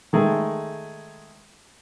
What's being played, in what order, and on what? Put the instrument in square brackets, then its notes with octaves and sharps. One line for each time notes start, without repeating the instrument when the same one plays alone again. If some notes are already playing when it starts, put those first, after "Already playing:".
[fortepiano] D#3 G#3 A3